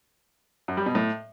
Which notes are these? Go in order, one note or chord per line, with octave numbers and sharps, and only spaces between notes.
F#2
G3
B2
A2